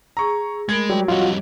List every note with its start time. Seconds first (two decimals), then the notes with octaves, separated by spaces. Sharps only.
0.17 G#4 A#5 C#6 E6
0.69 G#3 A3 A#4 B5 G#6 D7
0.90 F#3 G3 G4
1.08 F2 G3 F4 F#4 C#5 D#5